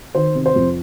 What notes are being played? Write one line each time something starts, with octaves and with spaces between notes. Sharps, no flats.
D#3 C5
C3
C5
F2